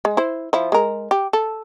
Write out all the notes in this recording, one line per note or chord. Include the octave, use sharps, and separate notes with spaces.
G#3
E4 C5
F3 E4
G#3 A#4
G4
A4